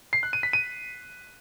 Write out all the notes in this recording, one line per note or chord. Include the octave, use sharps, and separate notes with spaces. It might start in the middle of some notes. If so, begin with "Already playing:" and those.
C7
F#6
D#7
B6
D#7